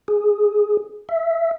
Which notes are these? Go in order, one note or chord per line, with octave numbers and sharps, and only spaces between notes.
G#4
E5